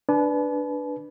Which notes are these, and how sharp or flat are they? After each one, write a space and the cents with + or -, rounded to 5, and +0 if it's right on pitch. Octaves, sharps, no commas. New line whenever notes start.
D4 +0 B4 +0 A5 -45